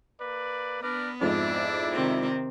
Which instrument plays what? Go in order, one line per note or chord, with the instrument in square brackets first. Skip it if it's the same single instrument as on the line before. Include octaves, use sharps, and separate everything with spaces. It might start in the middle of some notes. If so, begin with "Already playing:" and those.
[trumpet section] A#3 B4 D5
[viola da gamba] B3 [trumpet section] D4 B4 D5 [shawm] A#4
[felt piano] F2 G#2 [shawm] D4 [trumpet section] E4 D5 E5
[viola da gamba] C3 D#3 C4